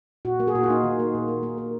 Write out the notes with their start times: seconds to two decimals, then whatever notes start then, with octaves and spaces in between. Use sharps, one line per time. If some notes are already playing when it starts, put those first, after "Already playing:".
0.25 A#2 F#4
0.40 A#3
0.47 G#4
0.55 A#2 F#4
0.63 F4
0.70 A#3 D#4
0.84 D#3
1.00 A#3
1.15 A#2
1.28 A#3
1.43 A#3
1.58 A#3